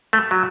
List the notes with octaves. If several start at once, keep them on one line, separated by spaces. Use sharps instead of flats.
A3
F#3